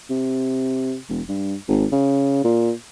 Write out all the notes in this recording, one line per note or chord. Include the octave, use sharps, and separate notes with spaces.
C3
E1
G2
G#1
C#3
A#2